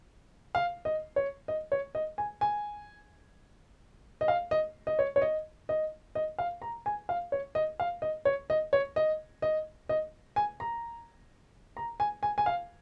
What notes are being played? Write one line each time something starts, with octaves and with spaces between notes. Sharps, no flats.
F5
D#5
C#5
D#5
C#5
D#5
G#5
G#5
D#5
F5
D#5
D#5
C#5
C#5
D#5
D#5
D#5
F5
A#5
G#5
F5
C#5
D#5
F5
D#5
C#5
D#5
C#5
D#5
D#5
D#5
G#5
A#5
A#5
G#5
G#5
G#5
F5